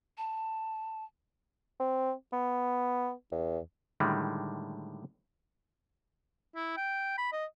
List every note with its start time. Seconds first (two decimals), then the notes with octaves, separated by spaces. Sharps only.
0.18 A5
1.80 C4
2.33 B3
3.32 E2
4.00 A2 D3 D#3 G3 G#3
6.56 E4
6.77 G5
7.18 B5
7.32 D#5